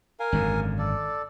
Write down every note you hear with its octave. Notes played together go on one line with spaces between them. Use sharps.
A#4 F5 G#5
G#1 F#2 D3
A4 D5